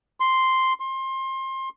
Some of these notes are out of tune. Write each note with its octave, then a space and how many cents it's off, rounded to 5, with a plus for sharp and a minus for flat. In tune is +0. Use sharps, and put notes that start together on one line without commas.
C6 +0
C6 +25